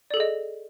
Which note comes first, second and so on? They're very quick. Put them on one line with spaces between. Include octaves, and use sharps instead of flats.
D5 A4 G#4 D#5